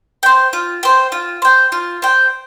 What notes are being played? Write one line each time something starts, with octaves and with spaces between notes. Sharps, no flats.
C5 G5
F4
C5 G5
F4
C5 G5
F4
C5 G5